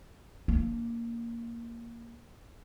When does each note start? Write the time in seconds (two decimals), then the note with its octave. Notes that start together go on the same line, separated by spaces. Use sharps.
0.48 A#3 D4